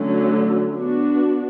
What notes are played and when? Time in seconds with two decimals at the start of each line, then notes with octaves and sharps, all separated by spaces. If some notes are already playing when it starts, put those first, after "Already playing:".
Already playing: D3 F#3 A3 C#4
0.76 B3 D4 F#4